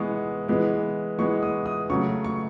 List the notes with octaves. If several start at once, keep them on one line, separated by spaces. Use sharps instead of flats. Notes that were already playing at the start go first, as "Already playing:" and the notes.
Already playing: E3 G#3 B3 C#6
E3 G#3 B3
E3 G#3 B3 C#6
D#6
D#6
C#3 F#3 A3 C#6
C#6